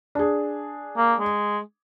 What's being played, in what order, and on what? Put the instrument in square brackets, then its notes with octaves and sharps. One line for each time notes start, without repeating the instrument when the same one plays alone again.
[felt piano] D4 G#4
[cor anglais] A#3
G#3